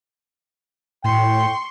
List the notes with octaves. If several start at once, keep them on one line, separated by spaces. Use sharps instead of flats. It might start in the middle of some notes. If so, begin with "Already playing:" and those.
A2 G5 C6 C#6